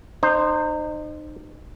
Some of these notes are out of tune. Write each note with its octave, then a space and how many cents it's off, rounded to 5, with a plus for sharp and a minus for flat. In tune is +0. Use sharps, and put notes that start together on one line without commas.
D#4 -30 C5 +0